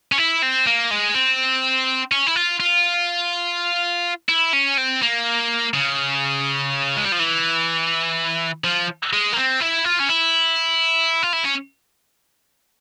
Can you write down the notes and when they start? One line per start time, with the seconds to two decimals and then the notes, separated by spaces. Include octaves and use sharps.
0.12 C#4
0.18 E4
0.42 C4
0.67 A#3
0.91 G#3
1.15 C4
2.12 C#4
2.27 E4
2.36 F4
2.60 F4
4.29 E4
4.53 C#4
4.78 C4
5.02 A#3
5.74 C#3
6.96 G#3
7.04 G3
7.12 F3
7.19 E3
8.64 F3
9.13 G#3
9.33 A#3
9.37 C4
9.61 E4
9.85 F4
10.00 C#4
10.09 E4
11.23 F4
11.33 E4
11.44 C#4